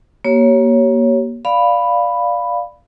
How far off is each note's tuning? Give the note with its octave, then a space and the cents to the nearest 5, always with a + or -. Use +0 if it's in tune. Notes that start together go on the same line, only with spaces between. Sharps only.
A#3 +20 G4 -30 C#5 +0
D5 +0 F5 +0 B5 +0